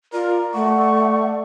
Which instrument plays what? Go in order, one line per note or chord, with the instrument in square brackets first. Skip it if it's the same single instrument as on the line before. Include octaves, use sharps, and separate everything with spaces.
[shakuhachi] F4 [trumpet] A#4 [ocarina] D5
[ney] A3 [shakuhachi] F#5 [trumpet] C#6